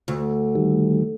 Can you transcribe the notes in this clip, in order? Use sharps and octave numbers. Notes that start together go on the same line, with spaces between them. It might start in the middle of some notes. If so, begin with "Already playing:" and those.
D2
D#3 G3 A3